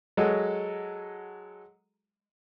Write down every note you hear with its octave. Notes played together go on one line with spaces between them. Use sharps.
F#3 G#3 F#4 A4 D#5